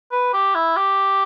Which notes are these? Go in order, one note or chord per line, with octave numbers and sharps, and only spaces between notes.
B4
G4
E4
G4